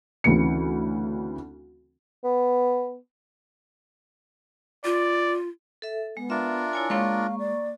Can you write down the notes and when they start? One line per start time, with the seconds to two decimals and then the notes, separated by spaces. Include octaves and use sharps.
0.24 D2 C#3 E3 C4 C#7
2.24 B3
4.85 F4 D5
5.82 A4 E5
6.17 G#3 B3
6.30 D4 F4 A#4 E5
6.73 E4 C#5 G#5
6.90 G#3 A#3 C#5 F5 C6 C#6
7.39 D5